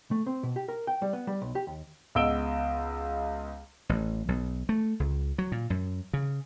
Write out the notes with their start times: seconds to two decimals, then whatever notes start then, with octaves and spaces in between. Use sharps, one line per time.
0.11 A3
0.26 C4
0.43 B2
0.56 G4
0.68 A#4
0.87 G5
1.02 G3
1.13 B3
1.27 G3
1.42 B1
1.55 G4
1.67 D#2
2.15 C#2 B3 D#5 E6 D7 G7
3.89 A1
4.28 B1
4.69 A3
5.00 C#2
5.38 F#3
5.52 A#2
5.70 F#2
6.13 C#3